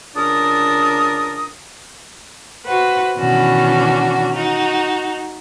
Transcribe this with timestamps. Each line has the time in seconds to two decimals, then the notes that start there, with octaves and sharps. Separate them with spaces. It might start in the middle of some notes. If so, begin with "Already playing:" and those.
0.16 C#2 D4 A#4 D5 D#6
2.65 F#4 B4 C5 F#5
3.18 B2 D#3 E3 C#4 D4 F#4
4.32 D#4 F#4